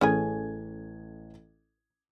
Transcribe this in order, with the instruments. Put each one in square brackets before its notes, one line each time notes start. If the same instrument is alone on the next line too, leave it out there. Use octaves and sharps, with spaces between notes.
[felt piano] A1 A4 G#6 [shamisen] C#4 G#4 G#5